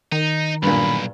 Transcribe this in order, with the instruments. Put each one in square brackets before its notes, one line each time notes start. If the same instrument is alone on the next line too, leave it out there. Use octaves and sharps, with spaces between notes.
[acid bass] D#3 [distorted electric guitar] D#4
[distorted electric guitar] B1 [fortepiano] G2 A#2 [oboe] B5